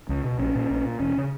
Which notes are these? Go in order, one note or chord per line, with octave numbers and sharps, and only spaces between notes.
C#2
B2
A#1 C#4
A#2
A#1
A#2
E1 C#4
C#3